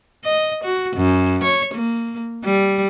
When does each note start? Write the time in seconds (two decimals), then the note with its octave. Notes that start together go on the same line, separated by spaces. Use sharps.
0.24 D#5
0.64 F#4
0.96 F#2
1.44 C#5
1.74 A#3
2.45 G3